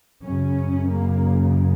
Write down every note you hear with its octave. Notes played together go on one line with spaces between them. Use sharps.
F#2 C#3 C#4
A#3